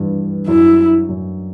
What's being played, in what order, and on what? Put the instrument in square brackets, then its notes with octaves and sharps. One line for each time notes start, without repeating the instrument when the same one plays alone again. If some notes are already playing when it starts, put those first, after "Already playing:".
Already playing: [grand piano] G2 E3
[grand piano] F#2 [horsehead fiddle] E4
[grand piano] F#2